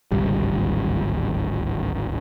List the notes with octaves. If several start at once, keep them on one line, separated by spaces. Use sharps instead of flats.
D1 G#1 C#2 G3